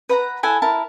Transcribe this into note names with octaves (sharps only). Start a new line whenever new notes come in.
B4 F#5 A#5
E4 A4 F#5 G#5
E4 A#4 A5